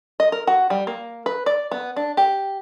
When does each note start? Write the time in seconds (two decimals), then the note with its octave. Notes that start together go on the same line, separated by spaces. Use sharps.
0.20 D#5
0.32 A#4
0.47 F#4
0.70 G3
0.87 A#3
1.26 B4
1.46 D5
1.71 B3
1.96 D4
2.17 G4